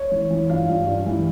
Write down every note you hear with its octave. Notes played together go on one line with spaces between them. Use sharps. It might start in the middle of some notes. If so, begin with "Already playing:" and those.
Already playing: C#5
E3
E3
G2 F5
G2
G2
E3